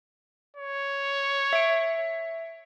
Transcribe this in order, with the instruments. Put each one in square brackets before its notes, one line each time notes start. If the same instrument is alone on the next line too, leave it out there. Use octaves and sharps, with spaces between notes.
[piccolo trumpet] C#5
[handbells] E5 D7